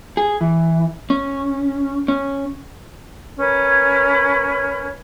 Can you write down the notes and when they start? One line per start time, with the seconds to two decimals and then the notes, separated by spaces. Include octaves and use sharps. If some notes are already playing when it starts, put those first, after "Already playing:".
0.17 G#4
0.41 E3
1.10 C#4
2.08 C#4
3.37 C#4 A#4 B4 C#5